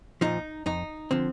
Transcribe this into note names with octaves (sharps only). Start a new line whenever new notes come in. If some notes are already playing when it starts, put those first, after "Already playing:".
A#2 F3 D#4
F2 D#4
D3 F3 C4